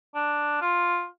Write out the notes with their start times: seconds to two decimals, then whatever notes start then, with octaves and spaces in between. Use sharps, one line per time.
0.15 D4
0.61 F4